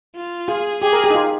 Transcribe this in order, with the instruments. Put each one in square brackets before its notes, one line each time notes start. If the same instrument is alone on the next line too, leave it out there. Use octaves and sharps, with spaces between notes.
[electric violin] F4
[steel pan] F4 [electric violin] G#4
[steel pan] G4 [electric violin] G#4
[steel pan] A#4
G4
D#4
F4